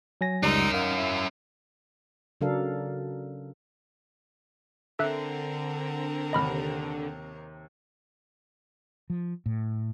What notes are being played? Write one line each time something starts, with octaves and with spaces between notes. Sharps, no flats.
F#3 G#5 A#6
C#2 G3 C#4 D#4 A#4
D#3 F5
E4
C#3 F#3 D4 A4 A#4 F5
D3 C4 A4 A#4 E5 F#6
D#2 C3 D#5 B5 F6
F3
A2